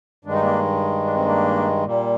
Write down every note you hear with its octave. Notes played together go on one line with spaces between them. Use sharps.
G2 D#3 G#3 D4
D#4
A#3 D4
D4
C4
A#3 D4
A#2 G3 A#3